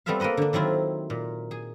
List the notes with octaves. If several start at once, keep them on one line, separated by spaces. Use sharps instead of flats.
G3 B3 C4 A4 E5 F5
A#3 A4 B4 D#5 F#5
D3 D4
D#3 F#3 C4 E4 F4
A#2
G#4